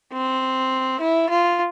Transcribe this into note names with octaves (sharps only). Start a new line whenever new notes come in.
C4
E4
F4